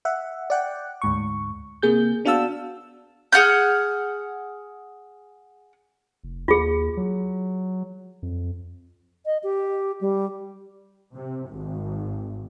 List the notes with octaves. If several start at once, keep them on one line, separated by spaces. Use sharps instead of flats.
E5 F#5
D5 F#5 G5
D2 G#2 C#6
C3 A#3 G#4 G6
B3 D4 F#4 F5 A5 E6
G#4 F#5 F6 G6
F1
D#2 F4 G#4
F#3
F2
D#5
G4
G3
C3
G#1